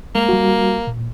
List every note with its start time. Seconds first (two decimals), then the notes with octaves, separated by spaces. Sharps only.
0.15 G#3 A#3
0.29 G3 F#4
0.87 A#2